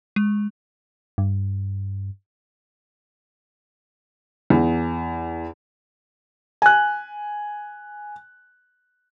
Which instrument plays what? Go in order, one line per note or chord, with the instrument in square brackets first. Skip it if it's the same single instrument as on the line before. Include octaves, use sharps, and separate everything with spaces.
[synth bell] G#3
[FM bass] G2
[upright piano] E2
[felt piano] G#5 F#6